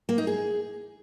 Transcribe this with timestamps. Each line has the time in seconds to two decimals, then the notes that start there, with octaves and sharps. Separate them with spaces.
0.09 A#3
0.18 D#4
0.27 G#4